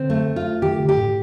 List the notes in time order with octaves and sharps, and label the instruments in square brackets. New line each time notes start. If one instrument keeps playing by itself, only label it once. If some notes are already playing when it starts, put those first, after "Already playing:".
Already playing: [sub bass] D3 [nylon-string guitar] C4
[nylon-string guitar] A3
F4
[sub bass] D#3 [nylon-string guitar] G4
[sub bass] D3
[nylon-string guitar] G4
[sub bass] A2